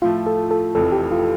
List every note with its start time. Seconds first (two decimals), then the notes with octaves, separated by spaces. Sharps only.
0.02 A2 F3 A3 F4
0.26 A4
0.51 A4
0.75 F1 F2 E3 A4
0.92 G4
1.12 F4